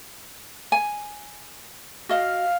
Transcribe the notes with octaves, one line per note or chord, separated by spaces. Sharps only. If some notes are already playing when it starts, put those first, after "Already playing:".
G#5
F#4 D#5 F5